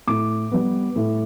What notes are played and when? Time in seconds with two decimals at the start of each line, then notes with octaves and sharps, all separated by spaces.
0.07 A2 D6
0.51 G3 B3
0.96 A2